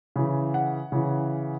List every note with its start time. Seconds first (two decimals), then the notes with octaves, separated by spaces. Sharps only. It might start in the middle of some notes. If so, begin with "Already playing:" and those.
0.16 C#3 E3
0.54 F#5
0.92 C#3 E3